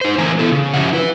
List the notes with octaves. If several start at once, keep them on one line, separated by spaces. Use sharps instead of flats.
D#4 C5
A2 E3 A#3 C4 G#5 A#5
B3 E4 A4
C#3
F3 C#4 D#4 G4 E5 F#5
E4 B4